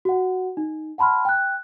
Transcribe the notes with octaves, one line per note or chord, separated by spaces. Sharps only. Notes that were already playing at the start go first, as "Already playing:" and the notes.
F#4 F#5
D#4
F#5 A5 B5 C6 F6
G5 F#6